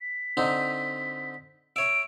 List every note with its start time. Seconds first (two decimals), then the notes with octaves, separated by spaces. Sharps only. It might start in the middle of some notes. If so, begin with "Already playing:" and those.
0.01 B6
0.37 D3 C4 D#4
1.76 C#5 E5 D7